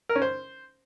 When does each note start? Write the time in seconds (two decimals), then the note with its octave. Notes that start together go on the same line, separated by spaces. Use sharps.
0.09 A#4
0.16 C#4
0.22 C5